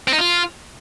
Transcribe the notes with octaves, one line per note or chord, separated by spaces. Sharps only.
C4
D#4
F4